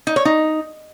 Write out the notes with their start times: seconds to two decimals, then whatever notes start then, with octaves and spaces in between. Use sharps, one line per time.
0.07 D#4
0.16 C#5
0.25 D#4